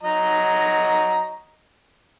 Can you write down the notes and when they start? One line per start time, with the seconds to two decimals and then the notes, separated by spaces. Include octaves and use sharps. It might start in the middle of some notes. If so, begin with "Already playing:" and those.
0.03 F#3 D#5 A#5